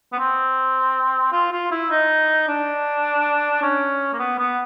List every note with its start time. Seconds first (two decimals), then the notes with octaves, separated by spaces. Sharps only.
0.13 B3
0.18 C4
1.32 F4
1.52 F4
1.71 E4
1.90 D#4
2.48 D4
3.62 C#4
4.13 A#3
4.19 B3
4.39 B3